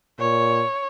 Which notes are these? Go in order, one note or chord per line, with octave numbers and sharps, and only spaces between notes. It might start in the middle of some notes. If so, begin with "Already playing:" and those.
A#2 C#5